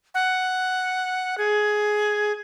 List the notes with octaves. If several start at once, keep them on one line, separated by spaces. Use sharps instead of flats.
F#5
G#4